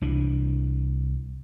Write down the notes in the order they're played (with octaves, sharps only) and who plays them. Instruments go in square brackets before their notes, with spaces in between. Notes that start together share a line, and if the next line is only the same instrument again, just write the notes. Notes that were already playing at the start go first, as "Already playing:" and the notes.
[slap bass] C2 E3 D4